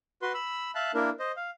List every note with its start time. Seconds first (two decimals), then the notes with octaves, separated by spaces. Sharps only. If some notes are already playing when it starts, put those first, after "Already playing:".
0.22 F#4 B4 C6
0.34 B5 E6
0.75 E5 F5 A5 F#6
0.94 A#3 D4 E4 A#4
1.19 C5 D#5
1.37 F5